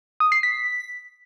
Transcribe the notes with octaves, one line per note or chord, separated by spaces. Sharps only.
D#6
C7
B6